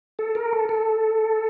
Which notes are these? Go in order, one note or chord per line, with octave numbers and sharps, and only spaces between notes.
A4
A#4
A4
A4